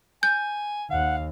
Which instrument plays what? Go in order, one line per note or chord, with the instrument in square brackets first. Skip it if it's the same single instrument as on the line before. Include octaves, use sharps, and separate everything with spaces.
[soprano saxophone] G#5 [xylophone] G6
[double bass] D#2 [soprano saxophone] F5 [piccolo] F#5